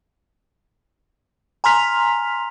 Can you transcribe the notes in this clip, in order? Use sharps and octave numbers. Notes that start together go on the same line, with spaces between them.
G#5 A#5 C6 F6 B6 F7